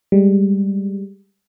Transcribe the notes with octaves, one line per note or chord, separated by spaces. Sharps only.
G3 G#3